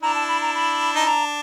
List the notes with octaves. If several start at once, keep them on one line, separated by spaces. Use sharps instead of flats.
D4 E4 A#5
A5
B5
A#5
B5
D#4
D4 A#5